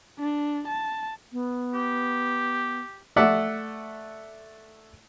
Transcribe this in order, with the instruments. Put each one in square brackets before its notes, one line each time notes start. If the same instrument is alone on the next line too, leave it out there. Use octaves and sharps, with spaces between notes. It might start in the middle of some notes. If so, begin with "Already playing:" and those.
[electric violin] D4
A5
[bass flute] B3
[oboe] G4
[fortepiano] A3 D5 E5 F#5